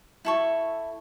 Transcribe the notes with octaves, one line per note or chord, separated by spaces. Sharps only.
E4 A4 C#6